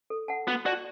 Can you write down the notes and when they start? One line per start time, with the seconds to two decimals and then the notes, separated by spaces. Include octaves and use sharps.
0.10 A4
0.28 F#5 A5
0.47 B3 F#4
0.66 F#4 D5 A5